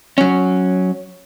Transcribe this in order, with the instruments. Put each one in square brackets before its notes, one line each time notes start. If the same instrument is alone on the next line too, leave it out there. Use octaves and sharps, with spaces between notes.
[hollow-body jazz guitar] F#3 C#4